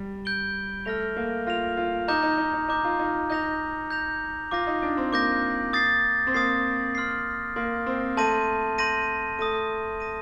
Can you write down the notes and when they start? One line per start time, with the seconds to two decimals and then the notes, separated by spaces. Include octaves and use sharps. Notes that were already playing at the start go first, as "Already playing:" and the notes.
Already playing: G3
0.25 G6 D7 G7
0.85 A3 F6 A#6 F7
1.16 A#3
1.47 F4 F6 A#6 F7
1.77 F4
2.08 D#4 A#5 D6 G6
2.23 D#4
2.38 D#4
2.53 D#4
2.68 D#4 A#5 D6 G6
2.84 F4
2.99 D#4
3.30 D#4 G6 A#6 F7
3.91 G6 A#6 F7
4.51 F4 D6 G6 A#6
4.67 D#4
4.82 D4
4.97 C4
5.13 A#3 D6 G6 A#6
5.73 D#6 A6 C7
6.27 C4
6.34 A#3 D#6 A6 C7
6.95 C6 F6 C7
7.56 A#3 C6 F6 C7
7.86 C4
8.17 A3 A5 C6 G6 A#6 D#7
8.78 A5 C6 G6 A#6 D#7
9.39 A3 D#6 A#6 D#7
10.00 D#6 A#6 D#7